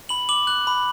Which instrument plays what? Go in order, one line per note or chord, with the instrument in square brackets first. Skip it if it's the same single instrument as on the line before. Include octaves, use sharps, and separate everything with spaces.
[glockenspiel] B5 F#7
D6 F#7
F#6 F#7
B5